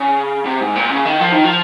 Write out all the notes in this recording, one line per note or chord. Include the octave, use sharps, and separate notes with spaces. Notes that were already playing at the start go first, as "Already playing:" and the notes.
Already playing: C#3
C3
G#2
A#2
C#3
D#3
F3
D#3
F3